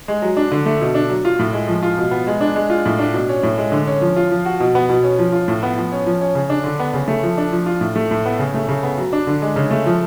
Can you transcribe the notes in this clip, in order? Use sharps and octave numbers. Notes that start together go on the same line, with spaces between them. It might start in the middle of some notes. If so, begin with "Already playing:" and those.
G#3
F#3
D4
D3
A3
B2
D4
F#3
F4
A2
G#3
F3
F4
B2
B3
G#3
D4
G#3
F4
A2
D4
B2
C#4
A2
G#3
D3
C#4
F3
F4
F3
F#4
B2
B3
B2
C#4
F3
F4
A2
B3
F3
C#4
F3
C#4
C#3
D4
D3
B3
C#3
A3
F3
D4
F3
F4
A2
A3
A2
B3
C#3
A3
C#3
B3
F#3
D4
D3
G#3
C#3
A3
F3